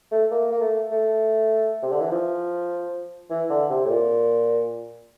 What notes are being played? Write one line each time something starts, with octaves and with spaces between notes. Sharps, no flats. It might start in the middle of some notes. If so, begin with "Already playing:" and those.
A3
A#3
A#3
A3
A3
C3
D3
E3
F3
E3
D3
C3
A2
A#2